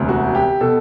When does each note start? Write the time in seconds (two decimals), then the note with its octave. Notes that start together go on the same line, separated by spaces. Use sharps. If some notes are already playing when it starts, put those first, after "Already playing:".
Already playing: E1 D2 C3
0.09 F#4
0.35 G4
0.61 B2 A4